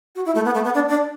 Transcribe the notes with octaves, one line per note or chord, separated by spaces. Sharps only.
F#4
E4
A3
B3
A3
B3
D4
D4